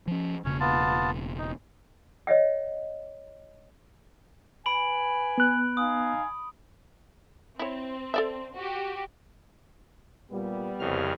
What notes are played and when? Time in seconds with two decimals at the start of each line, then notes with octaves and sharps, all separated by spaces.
0.07 F3 C#4
0.45 E1 C#3 A#3 C#4 C#5
0.60 B3 F4 A5
1.39 D#4
2.27 C#5 D#5 E5 F#5
4.66 B4 G#5 B5 D7 F#7
5.38 B3 F#6
5.77 D#4 F5 G#5 D#6
7.59 C4 E4 C#5
8.14 A4 D5 E5
8.56 F#4 G4
10.31 A#2 G3 B3
10.80 C2 F2 C#3 F6